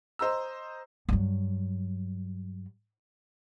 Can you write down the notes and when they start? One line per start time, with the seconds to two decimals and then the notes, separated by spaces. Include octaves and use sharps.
0.19 C5 D#5 A#5 E6
1.09 G2 F#3